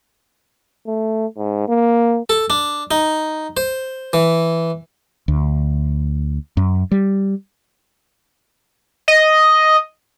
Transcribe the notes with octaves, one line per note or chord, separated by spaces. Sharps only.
A3
G#2
A#3
A4
D4
D#4
C5
E3
D2
F#2
G3
D#5